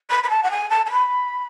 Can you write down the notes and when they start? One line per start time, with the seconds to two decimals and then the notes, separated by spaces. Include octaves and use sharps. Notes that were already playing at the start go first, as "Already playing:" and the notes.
0.10 B5
0.23 B5
0.29 A5
0.43 F#5
0.50 G#5
0.70 A5
0.85 A5
0.91 B5